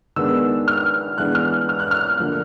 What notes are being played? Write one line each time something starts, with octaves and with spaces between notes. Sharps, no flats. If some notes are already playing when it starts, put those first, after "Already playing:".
D#3 G#3 B3 D4 E6
F6
E3 G#3 B3 D4 F#6
F6
F6
F#6
F6
D3 F3 A#3 D4